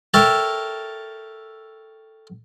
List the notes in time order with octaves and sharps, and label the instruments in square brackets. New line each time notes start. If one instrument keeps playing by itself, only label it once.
[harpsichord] A4 A#4 C#5 E5 G5 A5